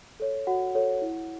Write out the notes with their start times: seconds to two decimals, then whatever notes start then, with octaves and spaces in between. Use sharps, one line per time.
0.20 A4 C#5
0.47 F#4 F#5
0.75 A4 C#5
1.02 E4